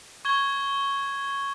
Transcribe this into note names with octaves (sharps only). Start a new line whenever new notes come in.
C#6 G#6 G7